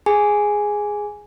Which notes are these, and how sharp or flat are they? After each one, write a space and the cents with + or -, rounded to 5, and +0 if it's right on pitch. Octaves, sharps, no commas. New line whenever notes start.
G#4 +0 G#5 +0